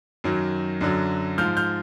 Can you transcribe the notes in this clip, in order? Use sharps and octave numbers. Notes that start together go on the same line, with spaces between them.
F#2 D#3 F#3
F#2 D3 F#3
G#2 F3 F6 G6
F6 G6